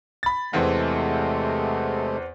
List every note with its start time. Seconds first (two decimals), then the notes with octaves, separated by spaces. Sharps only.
0.23 B5 A6
0.53 E2 C3 E3 G#3 A3 C4